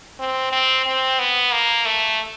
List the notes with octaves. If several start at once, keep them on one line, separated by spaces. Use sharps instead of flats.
C4
C4
C4
B3
A#3
A3